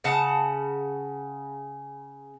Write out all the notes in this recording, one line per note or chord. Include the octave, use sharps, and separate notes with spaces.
C#3 F#5 A5